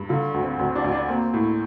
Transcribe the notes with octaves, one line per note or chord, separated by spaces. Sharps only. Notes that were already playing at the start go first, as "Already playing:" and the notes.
Already playing: G2
D3 F4
D2
C4
D2 C4
D4
D2
D4
A#3 C4
A2